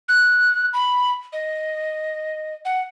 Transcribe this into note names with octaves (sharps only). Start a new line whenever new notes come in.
F#6
B5
D#5
F#5